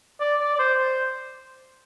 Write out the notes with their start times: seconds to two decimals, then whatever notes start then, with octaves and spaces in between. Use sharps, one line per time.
0.20 D5
0.40 D5
0.55 D5
0.59 C5
0.78 C5